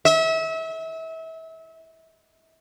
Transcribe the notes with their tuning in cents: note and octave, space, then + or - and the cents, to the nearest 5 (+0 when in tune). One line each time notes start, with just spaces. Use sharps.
E5 -30